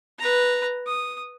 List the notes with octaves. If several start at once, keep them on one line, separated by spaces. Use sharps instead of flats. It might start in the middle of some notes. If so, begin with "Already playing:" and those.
B4 A#5
D#6